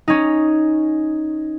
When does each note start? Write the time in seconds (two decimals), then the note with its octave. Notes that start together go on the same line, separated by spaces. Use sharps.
0.08 C#4 D#4